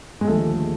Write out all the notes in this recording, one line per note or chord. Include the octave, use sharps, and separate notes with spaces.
G#3
D#2 D3 F3 A3